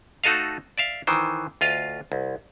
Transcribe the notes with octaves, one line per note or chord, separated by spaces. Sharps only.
A3 D#4 F#4 A4 D#5 F5
D5 E5 F5
D#3 E3 C5
D2 F4 D#5 F5
C2